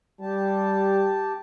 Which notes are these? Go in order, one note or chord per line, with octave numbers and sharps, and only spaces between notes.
G3 G4 A5